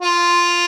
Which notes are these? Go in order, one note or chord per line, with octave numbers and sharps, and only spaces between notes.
F4